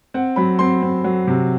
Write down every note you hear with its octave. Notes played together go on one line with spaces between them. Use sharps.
C4 F#5
F#3 B5
C4 C6
C4
F#3
C3